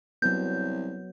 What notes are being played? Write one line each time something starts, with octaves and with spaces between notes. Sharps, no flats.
C2 F#3 B3 G6